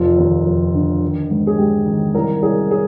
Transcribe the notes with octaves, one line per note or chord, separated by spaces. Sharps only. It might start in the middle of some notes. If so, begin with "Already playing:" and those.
Already playing: F1 F4
D#2
F1
D3
D#3
G#2
G#4
G#2 G4
D#3
C2 A#4
C2 G#4
G#4